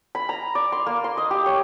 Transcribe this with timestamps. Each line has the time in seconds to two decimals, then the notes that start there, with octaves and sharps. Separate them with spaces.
0.15 B5
0.29 A#5
0.55 D5
0.72 C6
0.86 A#3
1.04 C6
1.17 D#5
1.31 G4
1.46 C#5